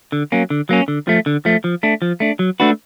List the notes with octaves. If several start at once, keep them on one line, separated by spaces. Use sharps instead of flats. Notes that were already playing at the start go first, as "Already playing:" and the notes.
D3
F#3 A#3 C#4
D3
F#3 A#3 C#4
D3
F3 A3
D3
F3 A3
F3
A3 D4
F3
A3 D4
F#3
A3 D4 F#4 B4